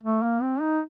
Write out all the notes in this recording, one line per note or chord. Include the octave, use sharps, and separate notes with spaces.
A3
A#3
C4
D#4